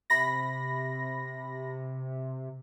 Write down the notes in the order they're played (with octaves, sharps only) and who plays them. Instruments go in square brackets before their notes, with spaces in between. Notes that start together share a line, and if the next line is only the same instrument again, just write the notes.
[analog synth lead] C3 [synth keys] B5 A#6